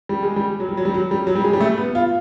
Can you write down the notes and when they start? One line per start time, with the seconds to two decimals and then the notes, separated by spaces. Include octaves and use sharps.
0.09 G3
0.23 G#3
0.36 G3
0.60 F#3
0.69 G3
0.77 F#3
0.85 G3
0.94 F#3
1.11 G3
1.27 F#3
1.35 G3
1.44 G#3
1.53 G3
1.61 A3
1.77 B3
1.95 F4